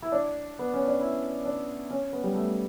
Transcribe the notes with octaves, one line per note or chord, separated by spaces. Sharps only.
E4
D4
B3
C#4
D4
E4
D4
C#4
B3
G3
A3